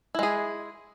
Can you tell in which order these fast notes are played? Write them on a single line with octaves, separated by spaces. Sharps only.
E4 G#3 G#4